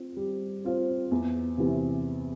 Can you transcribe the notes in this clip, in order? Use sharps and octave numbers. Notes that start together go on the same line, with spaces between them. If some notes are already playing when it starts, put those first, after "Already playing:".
Already playing: C4 F4 C5
G3
C4 F4 C5
E2
C3 E3